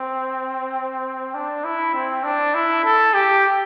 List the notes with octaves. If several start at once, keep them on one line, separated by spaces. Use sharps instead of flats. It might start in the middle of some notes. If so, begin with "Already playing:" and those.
Already playing: C4
D4
E4
C4
D4
E4
A4
G4